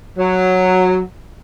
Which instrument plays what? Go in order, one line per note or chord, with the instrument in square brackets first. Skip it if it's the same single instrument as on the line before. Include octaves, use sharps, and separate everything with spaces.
[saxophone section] F#3